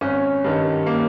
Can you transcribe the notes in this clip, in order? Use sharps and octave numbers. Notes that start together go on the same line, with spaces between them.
G#1 C#4
G2 D#3 G3
A#3